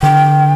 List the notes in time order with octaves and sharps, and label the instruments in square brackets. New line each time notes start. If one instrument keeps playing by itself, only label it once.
[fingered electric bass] D3 [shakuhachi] G5